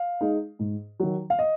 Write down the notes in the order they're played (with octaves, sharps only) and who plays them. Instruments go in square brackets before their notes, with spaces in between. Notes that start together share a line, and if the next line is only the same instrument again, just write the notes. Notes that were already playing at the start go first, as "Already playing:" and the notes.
Already playing: [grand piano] F5
G#3 D#4
G#2
D#3 F#3
F5
D#5